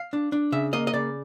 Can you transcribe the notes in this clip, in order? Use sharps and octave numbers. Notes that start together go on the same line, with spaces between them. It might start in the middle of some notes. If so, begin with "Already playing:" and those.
Already playing: F5
D4
D4
C#3 E5
A#3 D#5
D#5
C#3 D5